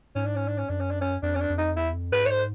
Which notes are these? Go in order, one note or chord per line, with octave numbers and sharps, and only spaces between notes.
G#2 C#4
D4
C#4
D4
C#4
F#2 D4
C#4
D4
C#4
F2 D4
C#4
D4
F2
D#4
E2 E4
F2
G#2 B4
C#5
C5